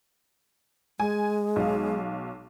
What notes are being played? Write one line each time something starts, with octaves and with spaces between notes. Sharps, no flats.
G#3 G#5
B1 F5